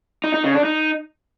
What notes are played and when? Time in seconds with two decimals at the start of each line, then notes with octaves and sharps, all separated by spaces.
0.24 D#4
0.34 D#4
0.44 C#3
0.54 D4
0.65 D#4